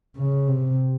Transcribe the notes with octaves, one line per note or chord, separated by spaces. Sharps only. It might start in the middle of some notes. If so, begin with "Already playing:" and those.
C#3
C3